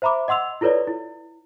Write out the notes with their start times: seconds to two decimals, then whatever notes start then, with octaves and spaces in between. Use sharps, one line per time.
0.02 C5 E5 A#5 B5 D6
0.28 D#5 F#5 C6 E6 F7
0.61 E4 F4 A4 B4 C#5 D5
0.87 E4